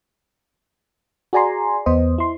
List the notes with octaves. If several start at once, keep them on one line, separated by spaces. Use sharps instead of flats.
F#4 G#4 D5 G#5 A#5 C6
E2 B3 C5 D#5
E4 C6